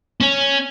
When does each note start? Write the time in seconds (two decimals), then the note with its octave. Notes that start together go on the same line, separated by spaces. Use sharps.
0.20 C#4